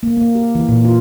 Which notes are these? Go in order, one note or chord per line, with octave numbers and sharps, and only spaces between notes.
A#3
A#3
G4
E3
A#2
F4